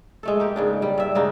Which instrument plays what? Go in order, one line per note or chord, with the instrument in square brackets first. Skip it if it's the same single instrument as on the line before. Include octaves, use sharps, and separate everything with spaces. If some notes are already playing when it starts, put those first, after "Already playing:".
[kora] G#3 A3 A4
A#3 G4
G#2 C#3 D4
G3
G2 E5
C#3 A#3 D4 D#4